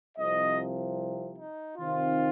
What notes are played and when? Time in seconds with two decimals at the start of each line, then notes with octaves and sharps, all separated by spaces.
0.17 C2 C3 F3 D#5
1.37 D#4
1.76 C3 D#3 C4 D#4 F4